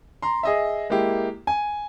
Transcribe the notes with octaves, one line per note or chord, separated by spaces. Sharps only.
A#5 C6
G#4 D#5 E5
G#3 A#3 E4 G4
G#5